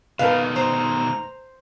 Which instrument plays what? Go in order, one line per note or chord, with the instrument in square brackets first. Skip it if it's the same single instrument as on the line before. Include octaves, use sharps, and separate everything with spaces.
[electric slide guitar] B2 D#3 A3 [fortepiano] A#4 B4 [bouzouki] F5
[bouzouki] C5 [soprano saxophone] A#5